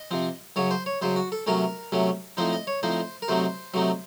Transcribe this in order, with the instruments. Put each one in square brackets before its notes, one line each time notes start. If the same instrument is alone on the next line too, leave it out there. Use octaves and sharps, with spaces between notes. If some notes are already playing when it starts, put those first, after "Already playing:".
Already playing: [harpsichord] D#5
C3 F3 C4
F#2 C#3 F#3 C#5
C5
C#5
F#2 C#3 F#3 C5
F#4
A4
C3 F#3 A3 C#4 A#4
C3 F#3 A3 C#4
A2 F3 C4 D#4 C5
D#5
C#5
A2 F3 C4 D#4 C5
A#4
C3 F#3 A3 C4 D#4 C5
C3 F#3 A3 C4 D#4